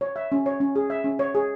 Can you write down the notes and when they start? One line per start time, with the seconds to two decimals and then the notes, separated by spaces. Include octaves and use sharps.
0.01 C#5
0.16 E5
0.32 C#4
0.46 C#5
0.60 C#4
0.76 G#4
0.90 E5
1.04 C#4
1.19 C#5
1.35 G#4